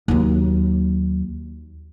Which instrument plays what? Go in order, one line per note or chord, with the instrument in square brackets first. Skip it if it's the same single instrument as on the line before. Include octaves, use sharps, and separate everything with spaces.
[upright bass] D#2 F#3